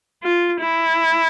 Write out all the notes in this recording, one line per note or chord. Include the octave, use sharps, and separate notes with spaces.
F4
E4